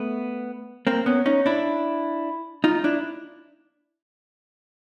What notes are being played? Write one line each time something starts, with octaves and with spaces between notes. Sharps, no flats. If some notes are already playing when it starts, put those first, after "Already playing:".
Already playing: A3 B3
A#3 C4
B3 C#4
C#4 D#4
D4 E4
D#4 F4
D4 E4